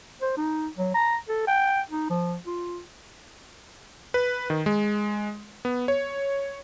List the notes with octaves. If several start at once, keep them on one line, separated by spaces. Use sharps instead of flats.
C5
D#4
F#3
A#5
A4
G5
D#4
F3
F4
B4
D#3
G#3
B3
C#5